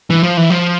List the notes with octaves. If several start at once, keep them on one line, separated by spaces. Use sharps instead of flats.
E3
F3
E3
F3